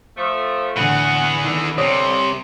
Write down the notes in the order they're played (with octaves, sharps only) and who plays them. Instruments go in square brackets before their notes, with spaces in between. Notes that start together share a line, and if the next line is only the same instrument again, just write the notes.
[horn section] F3 A3
[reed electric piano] A2 D3 [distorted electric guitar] E3 G#4 [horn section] F#5
[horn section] D3 [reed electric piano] D#3
[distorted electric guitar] C2 C3 [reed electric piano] C#5 D6 D#6